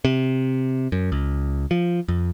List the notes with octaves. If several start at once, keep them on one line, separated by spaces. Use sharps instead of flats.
C3
F#2
C#2
F3
F2